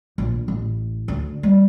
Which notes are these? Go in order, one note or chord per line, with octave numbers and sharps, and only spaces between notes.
A#1
A1
D2
G3